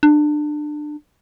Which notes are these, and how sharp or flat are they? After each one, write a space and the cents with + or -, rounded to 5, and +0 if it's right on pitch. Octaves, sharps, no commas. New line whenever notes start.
D4 +25